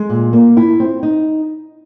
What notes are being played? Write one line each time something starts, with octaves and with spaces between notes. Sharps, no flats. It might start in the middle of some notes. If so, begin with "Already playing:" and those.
Already playing: G#3
A#2
A#3
E4
C4
D#4